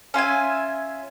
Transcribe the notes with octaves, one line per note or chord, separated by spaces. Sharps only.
C#4 F4 E5 G#5